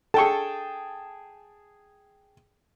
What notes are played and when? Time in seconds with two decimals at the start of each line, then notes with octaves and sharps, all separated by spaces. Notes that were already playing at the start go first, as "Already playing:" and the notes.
0.14 G#4 A4 G5 A5 C#6